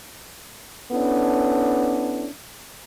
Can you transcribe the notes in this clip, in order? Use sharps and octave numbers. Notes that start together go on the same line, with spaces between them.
B3 C#4 D4 E4 A4